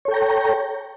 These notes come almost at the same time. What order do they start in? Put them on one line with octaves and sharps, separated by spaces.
C#5 A4 G5 A#5